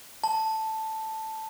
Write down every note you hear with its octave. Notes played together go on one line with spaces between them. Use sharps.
A5